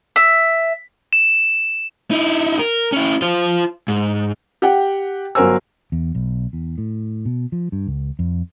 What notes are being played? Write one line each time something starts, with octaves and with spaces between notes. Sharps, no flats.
E5
E7
D#4 E4
A#4
C#4 E4
F4 C5
G#2
G4 F#5 G5
G1 F#3 A#4 C5 G#5 E6
E2
B1
E2
A2
B2
F3
G2
C#2
F2